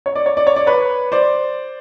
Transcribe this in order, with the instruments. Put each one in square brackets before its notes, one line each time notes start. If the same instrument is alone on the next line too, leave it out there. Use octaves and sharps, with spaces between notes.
[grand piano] C#5
D5
C#5
D5
C#5
D5
B4 C#5
C5 D5